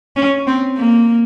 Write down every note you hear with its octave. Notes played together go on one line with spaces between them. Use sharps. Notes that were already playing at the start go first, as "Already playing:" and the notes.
C#4
C4
A#3